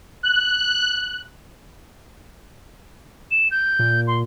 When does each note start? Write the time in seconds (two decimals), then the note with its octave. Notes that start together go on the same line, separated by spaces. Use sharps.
0.23 F#6
3.31 E7
3.51 G6
3.79 A#2
4.07 C6